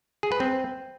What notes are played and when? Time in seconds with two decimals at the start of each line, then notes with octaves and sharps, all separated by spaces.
0.23 G#4
0.32 B4
0.40 C4